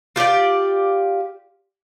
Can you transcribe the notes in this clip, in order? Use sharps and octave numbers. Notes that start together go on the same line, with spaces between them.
F4 G4 C#5 D5